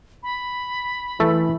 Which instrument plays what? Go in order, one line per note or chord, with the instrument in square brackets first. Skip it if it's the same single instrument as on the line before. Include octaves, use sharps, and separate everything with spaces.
[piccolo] B5
[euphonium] E3 [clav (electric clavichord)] A3